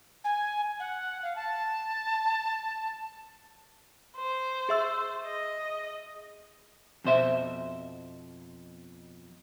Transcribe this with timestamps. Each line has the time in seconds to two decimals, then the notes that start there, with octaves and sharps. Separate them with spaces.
0.24 G#5
0.79 F#5
1.22 F5
1.35 A5
4.17 C5
4.69 G#4 E5 E6
5.24 D#5
7.04 F2 B2 C5 E5